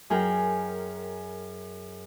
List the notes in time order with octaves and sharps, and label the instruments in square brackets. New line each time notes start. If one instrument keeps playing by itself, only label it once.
[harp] F#2 G#4 A#4 G5